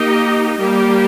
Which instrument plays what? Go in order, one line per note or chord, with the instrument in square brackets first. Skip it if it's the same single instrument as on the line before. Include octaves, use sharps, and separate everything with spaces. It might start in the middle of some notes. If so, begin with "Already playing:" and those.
Already playing: [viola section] A#3 D#4 G4 D#5
G3 A#3 G4